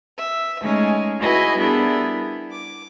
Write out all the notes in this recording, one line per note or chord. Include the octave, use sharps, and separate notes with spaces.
E5
G#3 A3 C#4 D#4 G#4
E4 F#4 G#4 B4 D#5
G3 B3 D4 E4 G#4 A#4
D6